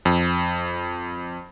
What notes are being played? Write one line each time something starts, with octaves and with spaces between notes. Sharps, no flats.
F2